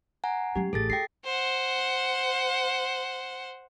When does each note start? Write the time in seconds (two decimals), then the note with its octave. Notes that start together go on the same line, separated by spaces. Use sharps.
0.24 F#5 G#5 A#5
0.56 F#3 C#4 G4
0.73 A1 G#4 A4 A6
0.90 F4 G5 A#6 C7
1.25 C5 F#5